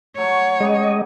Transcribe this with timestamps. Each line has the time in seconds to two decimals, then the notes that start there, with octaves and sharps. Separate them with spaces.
0.17 F#3 A3 C#5
0.60 C#3 G#3 B3 G4 D#5